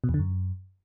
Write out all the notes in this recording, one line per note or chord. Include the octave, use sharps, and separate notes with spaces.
B2
E2
D3
F#2